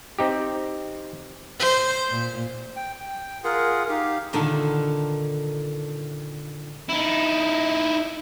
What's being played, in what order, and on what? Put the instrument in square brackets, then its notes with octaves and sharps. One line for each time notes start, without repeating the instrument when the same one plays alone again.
[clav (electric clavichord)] C4 D#4 G4
[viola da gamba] C5
A#2
[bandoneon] G5
G5
[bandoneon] F4 G#4 F#5 [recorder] A#4
[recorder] D#4 [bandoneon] G4 F5
[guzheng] A#2 D3 D#3 A4 E5 F#5
[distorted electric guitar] D#4 E4